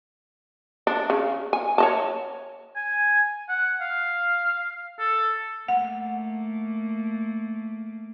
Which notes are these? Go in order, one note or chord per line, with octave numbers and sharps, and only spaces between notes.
D4
C#3
G#5
C#5 D#5 A5
G#5
F#5
F5
A4
A3 A#3 F#5